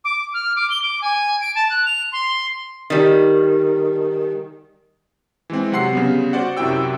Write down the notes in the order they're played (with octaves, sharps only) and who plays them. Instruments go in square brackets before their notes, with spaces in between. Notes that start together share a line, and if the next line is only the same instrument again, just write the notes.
[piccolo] D6
F6
D6
G7
D6
G#5
D7
A5
F#6
F7
C6
[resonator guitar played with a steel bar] D#3 G3
[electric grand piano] E3 G#3 C4
C3 F#3 F#5 C6 C7
C#3 G3 B3
F#4 C5 D5 F#5
F#2 C3 E4 F#4 G5 E6